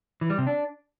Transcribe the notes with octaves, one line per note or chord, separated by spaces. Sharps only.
E3
G3
C3
D4